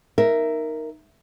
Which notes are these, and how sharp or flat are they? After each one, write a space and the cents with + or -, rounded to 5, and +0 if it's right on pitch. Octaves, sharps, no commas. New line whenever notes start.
D#4 +0 A#4 +0 E5 +10